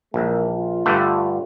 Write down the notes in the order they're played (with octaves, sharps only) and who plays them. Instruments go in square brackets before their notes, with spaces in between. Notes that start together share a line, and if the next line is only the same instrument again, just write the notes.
[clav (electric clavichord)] A#1 [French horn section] E3 G#3 A#3
[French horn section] F4
[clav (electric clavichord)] G2 D3 A3